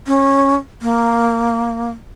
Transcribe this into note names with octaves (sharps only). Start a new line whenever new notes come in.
C#4
A#3